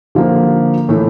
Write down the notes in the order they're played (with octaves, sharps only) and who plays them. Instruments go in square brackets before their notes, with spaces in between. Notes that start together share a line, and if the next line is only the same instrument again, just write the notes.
[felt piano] D3 F3 A#3
A2 E3 A3 E4